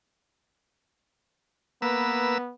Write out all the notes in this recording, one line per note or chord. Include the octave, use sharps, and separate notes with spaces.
A#3 B3 B4 E6